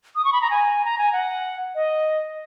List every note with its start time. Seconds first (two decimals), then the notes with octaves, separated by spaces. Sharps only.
0.16 D#6
0.25 C#6
0.33 B5
0.42 A#5
0.50 G#5
0.85 A#5
0.98 G#5
1.13 F#5
1.75 D#5